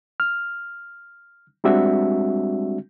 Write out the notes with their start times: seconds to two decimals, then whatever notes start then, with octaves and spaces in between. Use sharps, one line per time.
0.20 F6
1.64 G3 G#3 C4 D4 F#4 E5